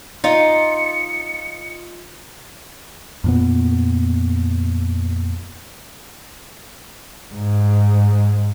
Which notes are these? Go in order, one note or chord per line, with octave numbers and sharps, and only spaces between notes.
D#4 F4 D#5 C#7
F2 A#2 B3
G#2